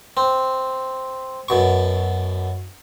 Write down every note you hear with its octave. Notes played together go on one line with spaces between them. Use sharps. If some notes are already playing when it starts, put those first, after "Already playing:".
C4
F#2 B2 C#6